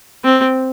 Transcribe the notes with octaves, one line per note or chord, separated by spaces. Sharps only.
C4